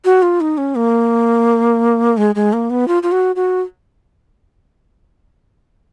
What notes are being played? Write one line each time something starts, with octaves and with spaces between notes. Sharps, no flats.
F#4
F4
D#4
C#4
A#3
G#3
G#3
A#3
B3
F4
F4
F#4
F#4